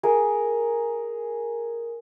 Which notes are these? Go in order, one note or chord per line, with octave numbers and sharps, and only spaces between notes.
G#4 A#4